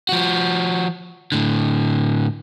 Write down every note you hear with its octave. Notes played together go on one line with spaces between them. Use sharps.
F3 F#4
A2 D3